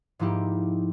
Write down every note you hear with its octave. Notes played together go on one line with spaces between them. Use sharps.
G#2 F3 A#3 D#4 E4 G4